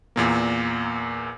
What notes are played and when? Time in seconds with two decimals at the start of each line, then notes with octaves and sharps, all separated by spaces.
0.16 E2 A#2 A#3